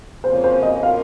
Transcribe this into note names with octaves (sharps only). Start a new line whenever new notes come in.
F2 C#3 F3 A#3 C#4 C5
C5
D#5
F3 A#3 C#4 F4 A#4 F5